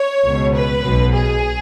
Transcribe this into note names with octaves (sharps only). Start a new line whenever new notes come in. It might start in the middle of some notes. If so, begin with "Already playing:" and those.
Already playing: C#5
C#2 B2
B4
B1 B2
G#4